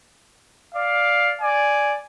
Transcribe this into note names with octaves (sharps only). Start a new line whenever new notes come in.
D5 F5
D5 G#5